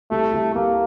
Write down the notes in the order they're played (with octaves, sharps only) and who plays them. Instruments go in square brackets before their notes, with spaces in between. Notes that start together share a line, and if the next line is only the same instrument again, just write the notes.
[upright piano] C2 [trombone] A3
[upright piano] C2
[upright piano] C2 [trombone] A#3